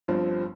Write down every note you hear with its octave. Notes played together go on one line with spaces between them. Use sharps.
G1 G2 F3 C4